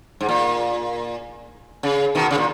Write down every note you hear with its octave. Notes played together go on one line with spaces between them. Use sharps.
G#2
A#2
C#3
B2 D#3
C#3
A#2